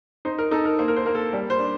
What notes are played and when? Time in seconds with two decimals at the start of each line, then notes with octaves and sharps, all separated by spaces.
0.25 D#4 C5
0.39 A#4
0.51 D#4 A4
0.65 A#4
0.79 A#3 C5
0.88 A#4
0.96 C5
1.06 A#3 A#4
1.15 A4
1.33 G3
1.50 C5
1.59 D4